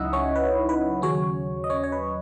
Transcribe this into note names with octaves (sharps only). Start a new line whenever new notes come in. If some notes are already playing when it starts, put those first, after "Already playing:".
Already playing: C#2 C#3 F#3 D#4 E4 D#5 E5 F#5
C#4 C#5
B4
B4
D#2 C#3 F#3 C#4 C#5
D#5
C#4 C#5
C#5
B4